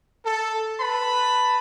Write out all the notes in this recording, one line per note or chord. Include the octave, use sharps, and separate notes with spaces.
A4
B4 A5 B5